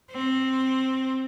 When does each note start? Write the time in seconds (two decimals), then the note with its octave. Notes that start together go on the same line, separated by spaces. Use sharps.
0.12 C4